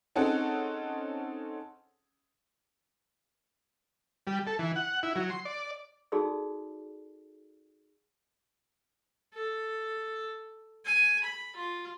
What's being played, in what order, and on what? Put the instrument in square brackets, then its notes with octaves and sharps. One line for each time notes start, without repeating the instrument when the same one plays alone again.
[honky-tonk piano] C4 C#4 D#4 G#4 A4 F#5
[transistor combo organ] G3
A4
E3
F#5
E4
F#3
C6
D5
[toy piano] D#4 F#4 G#4 A4 D5 E6
[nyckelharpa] A4
G#5
B5
F4